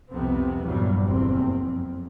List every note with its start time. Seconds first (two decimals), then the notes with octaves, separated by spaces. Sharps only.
0.12 C2 F2 C3 B3 C4
0.67 A#1 E2 G2 F#3 G3
1.07 F#1 E2 C4
1.61 F2